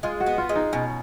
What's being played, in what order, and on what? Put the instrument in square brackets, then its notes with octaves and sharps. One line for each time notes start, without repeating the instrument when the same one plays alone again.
[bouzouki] G#3 [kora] F4
[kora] F#4
[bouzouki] B3
[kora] F4
[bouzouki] G#3
[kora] D#4
[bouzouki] B2 [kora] C#4